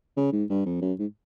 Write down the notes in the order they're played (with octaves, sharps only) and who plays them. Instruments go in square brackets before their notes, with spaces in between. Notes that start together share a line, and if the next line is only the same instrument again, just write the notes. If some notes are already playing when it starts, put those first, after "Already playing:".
[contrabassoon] C#3
G#2
G2
F2
F#2
G#2